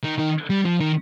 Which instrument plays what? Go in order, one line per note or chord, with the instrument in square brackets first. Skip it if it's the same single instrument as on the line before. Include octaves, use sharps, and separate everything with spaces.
[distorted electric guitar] D#3
D#3
G3
F3
D#3